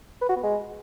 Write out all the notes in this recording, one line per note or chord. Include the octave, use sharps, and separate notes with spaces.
B4
F#4
B3
G#3